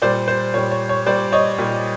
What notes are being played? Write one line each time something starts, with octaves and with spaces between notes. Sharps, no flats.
A#2 G3 C5 D5
C5
A#2 G3 C#5
C#5
C#5
A#2 G3 C5 D5
C#5 D#5
A#2 G3